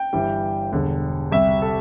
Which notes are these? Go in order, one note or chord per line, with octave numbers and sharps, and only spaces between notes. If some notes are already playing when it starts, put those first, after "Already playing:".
Already playing: G5
G1 G2 E3 G3
E1 E2 D3 G3
C2 C3 G3 E5
A4